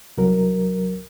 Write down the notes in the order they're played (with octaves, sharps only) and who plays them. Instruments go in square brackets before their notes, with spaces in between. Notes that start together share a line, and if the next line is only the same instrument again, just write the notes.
[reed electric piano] C2 F#3 A#4